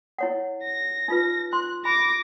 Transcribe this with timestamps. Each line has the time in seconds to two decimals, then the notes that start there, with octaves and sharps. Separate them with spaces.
0.19 E4 C#5 F#5
0.64 A#6
1.08 D#4 F4 B4
1.53 C6 F#6
1.85 B5 D6 A#6